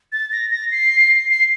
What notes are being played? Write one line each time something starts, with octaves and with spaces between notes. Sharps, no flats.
A6
A#6
A#6
C7
C7